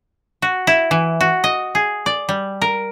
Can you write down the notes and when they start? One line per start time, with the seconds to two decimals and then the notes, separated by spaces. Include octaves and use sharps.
0.42 F#4
0.67 E4
0.91 E3
1.21 F#4
1.44 D#5
1.75 G#4
2.06 D5
2.29 G3
2.62 A#4